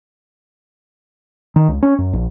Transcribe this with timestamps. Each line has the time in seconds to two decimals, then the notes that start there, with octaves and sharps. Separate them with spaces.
1.56 D#3
1.68 C#2
1.83 C#4
1.99 F#2
2.13 A#1